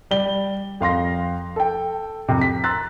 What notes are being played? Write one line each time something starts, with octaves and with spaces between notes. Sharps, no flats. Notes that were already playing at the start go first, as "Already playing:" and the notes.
G3 G7
F2 F5 C6 A#6
A4 G5
F2 C3
B6
A#5 C6 E6 F#6 A6